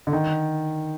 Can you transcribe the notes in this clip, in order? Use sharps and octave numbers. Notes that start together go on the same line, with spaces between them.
D3
D#3